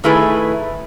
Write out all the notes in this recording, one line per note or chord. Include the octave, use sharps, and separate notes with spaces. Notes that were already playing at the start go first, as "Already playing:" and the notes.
D#3 A3 E4 G#4 B4